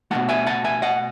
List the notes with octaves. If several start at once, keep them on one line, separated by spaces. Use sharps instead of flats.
B2 F#3 A3 F#5 A5
E5 G#5
F#5 A5
E5 G#5
D#5 F#5